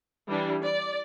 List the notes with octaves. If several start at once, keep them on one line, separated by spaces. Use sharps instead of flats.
E3 G3 D4
D5